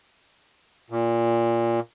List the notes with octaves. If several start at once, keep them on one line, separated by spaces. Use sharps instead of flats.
A#2